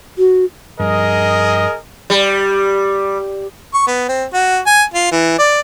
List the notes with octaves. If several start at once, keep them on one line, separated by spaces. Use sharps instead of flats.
F#4
G2 F3 G#4 A#4 D#5
G3
C#6
B3
C4
F#4
G#5
F4
E3
D5